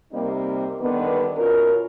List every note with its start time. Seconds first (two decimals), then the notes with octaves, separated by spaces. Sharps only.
0.13 C3 G3 A#3 C4 D#4
0.81 D3 D#3 G3 B3
1.37 B2 C#4 F4 A#4